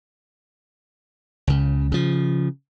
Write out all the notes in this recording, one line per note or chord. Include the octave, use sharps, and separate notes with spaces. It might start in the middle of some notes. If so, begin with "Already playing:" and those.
C#2 C#3
C#3 F3